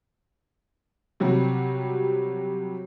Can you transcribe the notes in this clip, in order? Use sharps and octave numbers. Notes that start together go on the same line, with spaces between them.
C3 F#3 G3